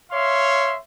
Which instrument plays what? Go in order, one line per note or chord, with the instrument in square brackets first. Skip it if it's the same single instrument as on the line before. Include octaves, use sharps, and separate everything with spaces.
[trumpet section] C#5 E5 F5 C6